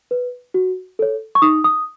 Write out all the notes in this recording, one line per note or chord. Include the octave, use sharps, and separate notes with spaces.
B4
F#4
A4 C#5
C#6
D#4 D#6
D#6